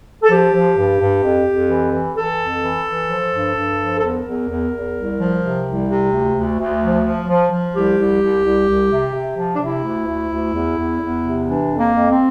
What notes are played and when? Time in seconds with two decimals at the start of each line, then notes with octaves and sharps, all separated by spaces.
0.22 A4
0.30 F3 G4
0.53 F3
0.77 G2
0.99 G2
1.23 F2
1.46 F2
1.69 E3
1.92 E3
2.16 E3 A4
2.39 F2
2.62 E3
2.86 E3
3.09 F3
3.32 G2
3.55 G2
3.79 F3
3.97 A4
4.02 E2 A#4
4.25 E2
4.48 E2
4.72 E2
4.95 C2
5.18 F3
5.42 C3
5.65 C2
5.89 C3
6.11 D2
6.35 D2
6.58 D2
6.81 F3
7.05 F3
7.28 F3
7.51 F3
7.74 C2 G4
7.97 C2
8.21 C2
8.44 C2
8.67 C2
8.91 C3
9.14 C3
9.37 F3
9.55 D4
9.60 C3 E4
9.83 D2
10.07 D2
10.30 D2
10.53 E2
10.77 E2
11.01 E2
11.23 C3
11.46 E3 D4
11.69 F2
11.78 A#3
11.93 F2
12.09 C4